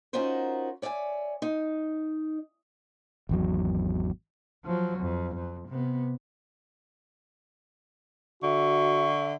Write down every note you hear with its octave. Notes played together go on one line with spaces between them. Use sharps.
C#4 D#4 F4 F#4 A#4 C5
C#5 D5 E5 F5 G#5
D#4
G#1 E2 F#3
F3 F#3
F2
F2
C3 B3
D3 F#4 E5 C#6